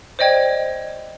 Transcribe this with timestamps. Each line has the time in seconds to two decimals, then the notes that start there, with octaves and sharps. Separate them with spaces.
0.19 C5 D5 D#5 G5 G#6